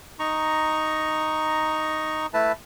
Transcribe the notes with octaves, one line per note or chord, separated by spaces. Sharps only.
D#4 A#5 C#6
A3 E4 B4 A5